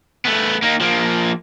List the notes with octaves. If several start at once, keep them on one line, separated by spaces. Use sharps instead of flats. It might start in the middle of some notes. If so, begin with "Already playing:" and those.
A3 B3
A#3 D#4
F3 A#3